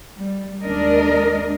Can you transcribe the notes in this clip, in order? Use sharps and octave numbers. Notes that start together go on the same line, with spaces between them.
G3
D#2 G#3 D4 A#4 D#5